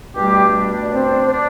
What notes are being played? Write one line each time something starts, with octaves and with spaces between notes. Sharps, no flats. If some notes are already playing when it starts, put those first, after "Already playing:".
B2 G3 A3 D4 G4
D5
C4 C5
C5
D4 D5